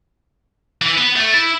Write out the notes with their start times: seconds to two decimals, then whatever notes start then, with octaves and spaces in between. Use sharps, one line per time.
0.82 E3
0.98 B3
1.16 A3
1.34 E4